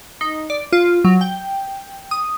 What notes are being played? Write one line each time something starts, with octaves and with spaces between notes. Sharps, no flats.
D#4
D5
F4
F#3
G5
D#6